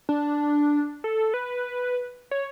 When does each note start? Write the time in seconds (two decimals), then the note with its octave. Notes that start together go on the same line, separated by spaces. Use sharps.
0.09 D4
1.04 A4
1.34 B4
2.31 C#5